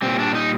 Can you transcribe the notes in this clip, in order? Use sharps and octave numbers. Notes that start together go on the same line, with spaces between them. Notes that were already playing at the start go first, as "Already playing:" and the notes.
A#2 G3 C4
D4
D#4